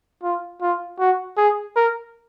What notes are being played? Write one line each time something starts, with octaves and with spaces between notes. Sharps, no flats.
F4
F4
F#4
G#4
A#4